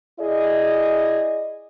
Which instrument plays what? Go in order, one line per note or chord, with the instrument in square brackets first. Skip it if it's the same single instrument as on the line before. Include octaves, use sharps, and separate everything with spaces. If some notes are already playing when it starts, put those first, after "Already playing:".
[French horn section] E4 G#4 D5 D#5